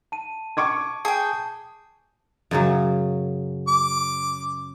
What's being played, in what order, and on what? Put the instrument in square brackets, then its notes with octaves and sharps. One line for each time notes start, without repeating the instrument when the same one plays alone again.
[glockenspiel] A5 D#7
[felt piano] C#6 D6 G#6
[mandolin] G#4 G5 [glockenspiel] A5
[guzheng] F#2 C#3 F#3
[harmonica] D6